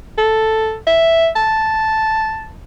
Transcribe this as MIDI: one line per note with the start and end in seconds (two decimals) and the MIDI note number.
0.18 0.76 69
0.87 1.28 76
1.36 2.50 81